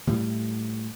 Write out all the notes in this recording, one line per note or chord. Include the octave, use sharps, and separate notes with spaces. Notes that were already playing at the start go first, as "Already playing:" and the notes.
A2 G3